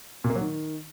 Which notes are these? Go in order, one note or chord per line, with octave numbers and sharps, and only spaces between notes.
A#2
A#3
F#3
D#3